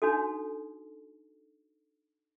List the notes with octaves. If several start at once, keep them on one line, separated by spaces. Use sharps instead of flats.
D4 D#4 F#4 A4